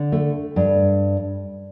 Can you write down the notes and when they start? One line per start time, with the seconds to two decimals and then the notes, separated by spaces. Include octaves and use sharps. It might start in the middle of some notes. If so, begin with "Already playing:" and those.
Already playing: D3
0.12 A3
0.56 G2